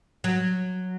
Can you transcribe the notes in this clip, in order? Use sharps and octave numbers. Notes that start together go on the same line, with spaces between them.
F#3